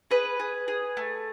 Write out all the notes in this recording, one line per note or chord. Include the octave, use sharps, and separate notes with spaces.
G#4 B4
G#4
G#4
A3